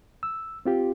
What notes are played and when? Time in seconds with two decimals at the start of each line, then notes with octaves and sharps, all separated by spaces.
0.23 E6
0.66 C4 F4 G4